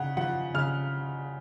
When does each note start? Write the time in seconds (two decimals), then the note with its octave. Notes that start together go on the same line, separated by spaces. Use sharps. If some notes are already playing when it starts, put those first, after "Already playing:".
Already playing: C#3 F#5
0.17 F3 F#5
0.54 C#3 F6